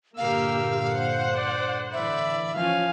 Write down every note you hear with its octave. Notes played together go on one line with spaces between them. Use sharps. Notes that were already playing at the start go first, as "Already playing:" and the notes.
G2 A#2 D3 A#3 G4 A#4 F5 E6
C5 F#5
D5
A2 D3 E3 D5 E5 B5
E3 F3 C#4 F5 G#5